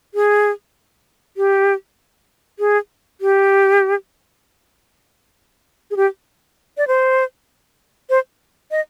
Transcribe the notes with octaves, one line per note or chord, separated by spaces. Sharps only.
G#4
G4
G#4
G4
G#4
G4
D5
C5
C5
D#5